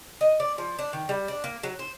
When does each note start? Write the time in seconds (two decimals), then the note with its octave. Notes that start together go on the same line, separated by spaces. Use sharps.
0.21 D#5
0.40 D5
0.58 F3
0.79 D4
0.93 D#3
1.09 G3
1.28 D4
1.44 A#3
1.63 F#3
1.79 C5